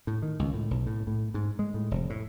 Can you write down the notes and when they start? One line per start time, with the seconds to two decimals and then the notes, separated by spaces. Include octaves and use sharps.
0.07 A2
0.22 D#3
0.39 C#2
0.54 A2
0.71 B1
0.87 A2
1.07 A2
1.34 G#2
1.59 G#3
1.74 A2
1.91 F1
2.10 A2